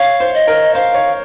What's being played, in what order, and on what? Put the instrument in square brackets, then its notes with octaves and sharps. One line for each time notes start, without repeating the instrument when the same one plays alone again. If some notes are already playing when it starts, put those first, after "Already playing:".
Already playing: [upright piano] C#5 [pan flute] F5
[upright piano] C5
[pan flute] D#5
[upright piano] A#4
[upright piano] C5 [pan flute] F5
[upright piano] C#5